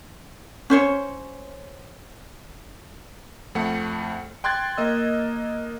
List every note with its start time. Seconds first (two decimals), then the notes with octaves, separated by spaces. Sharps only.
0.70 C#4 C5 C#5
3.55 F2 A3 F#5 C#7
4.44 G5 C6 F#6 G#6 A6
4.77 A#3 D#5 E6